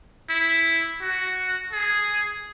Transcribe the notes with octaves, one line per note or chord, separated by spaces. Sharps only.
E4
F#4
G#4